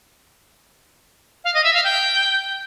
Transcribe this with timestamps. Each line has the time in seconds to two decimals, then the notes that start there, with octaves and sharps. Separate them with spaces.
1.44 F5
1.54 D#5
1.64 E5
1.74 F5
1.84 G5